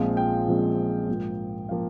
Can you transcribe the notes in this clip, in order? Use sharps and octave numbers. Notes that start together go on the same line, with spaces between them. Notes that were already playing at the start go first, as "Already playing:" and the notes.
Already playing: A#1 A#2 F3 G#3 C4 F5
G5
A#1 A#2 F3 G#3 C4
A#1 G#2 F3 A#3
F3 A#3 F5